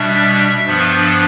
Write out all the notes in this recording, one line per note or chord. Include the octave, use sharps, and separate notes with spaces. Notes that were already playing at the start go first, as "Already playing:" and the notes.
Already playing: B2 G3 D4 E5
G2 F3 B3 D4